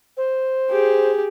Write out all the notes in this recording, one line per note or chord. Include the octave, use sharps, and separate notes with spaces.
C5
G4 G#4